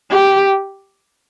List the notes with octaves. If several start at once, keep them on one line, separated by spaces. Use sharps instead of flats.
G4